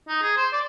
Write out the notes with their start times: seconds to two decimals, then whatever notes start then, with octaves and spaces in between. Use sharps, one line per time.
0.08 D#4
0.23 G#4
0.37 C5
0.53 D5